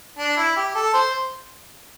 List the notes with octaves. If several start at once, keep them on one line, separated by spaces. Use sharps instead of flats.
D4
E4
G4
A4
C5